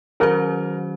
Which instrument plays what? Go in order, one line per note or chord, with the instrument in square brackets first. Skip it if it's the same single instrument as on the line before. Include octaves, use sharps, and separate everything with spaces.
[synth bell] D#3 F#3 C#4 F#4 C5 [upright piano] A#4